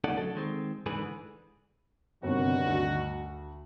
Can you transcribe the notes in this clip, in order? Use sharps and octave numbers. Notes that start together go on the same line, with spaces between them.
D2 C#4 D#4 A4 D5 F#5
F#3 A4
D#3 G#3 C4
G#2 D3 E3 G#4 B4
G1 G2 C3 D#3 F#4
D2